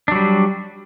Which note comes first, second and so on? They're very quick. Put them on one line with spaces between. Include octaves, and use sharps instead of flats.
D4 F#3 G3